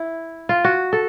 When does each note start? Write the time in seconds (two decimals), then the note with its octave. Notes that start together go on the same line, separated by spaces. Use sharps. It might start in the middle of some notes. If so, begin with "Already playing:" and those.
Already playing: E4
0.49 F4
0.64 F#4
0.93 A4